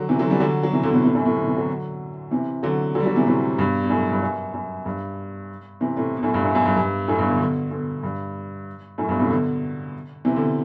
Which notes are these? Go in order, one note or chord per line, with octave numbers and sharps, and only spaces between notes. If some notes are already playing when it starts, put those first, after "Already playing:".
Already playing: D3 F#3
C3 E3
D3 F#3
E3 G3
D3 F#3
F#3
C3 E3
B2 D3
A2 C3
A2 C3
F#2 A2
A2 C3
B2 D3
C3 E3
D3 F#3
C3 E3
D3 F#3
D3 F#3
G3
D3 F#3
C3 E3
A2 C3
G2 B2
B2
F#2 A2
G2
F#2
F#2
G2
C3 E3
A2 C3
B2
F#2 A2
G2
F#2
F#2
G2
G2
F#2 A2
G2 B2
B2 D3
B2 D3
B2 D3
G2
F#2 A2
G2 B2
A2 C3
B2 D3
C3 E3
B2 D3